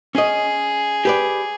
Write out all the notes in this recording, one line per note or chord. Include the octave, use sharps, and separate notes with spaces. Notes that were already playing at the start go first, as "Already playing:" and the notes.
C#4 G#4 D#5
G4 B4 D5